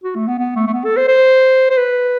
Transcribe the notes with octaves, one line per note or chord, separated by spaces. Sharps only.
F#4
A3
B3
B3
A3
A3
B3
A4
C5
C5
C5
B4